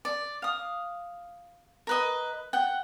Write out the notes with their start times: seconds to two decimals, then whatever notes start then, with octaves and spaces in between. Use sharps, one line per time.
0.05 D5
0.42 F5 D#6
1.87 A#4 B4 D#5
2.53 F#5 G5